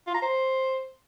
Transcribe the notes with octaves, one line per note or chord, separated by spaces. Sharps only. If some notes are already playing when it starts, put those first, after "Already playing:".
F4
A#5
C5